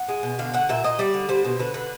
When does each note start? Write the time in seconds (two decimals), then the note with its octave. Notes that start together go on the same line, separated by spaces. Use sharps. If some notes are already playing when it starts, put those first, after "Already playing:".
Already playing: F#5
0.08 G#3
0.23 B2
0.39 D3 F5
0.54 D3 F#5
0.69 A#2 E5
0.84 A#2 D#5
0.99 G3 D5
1.14 D3
1.29 G3 C5
1.44 B2
1.59 D3 B4
1.74 D3 B4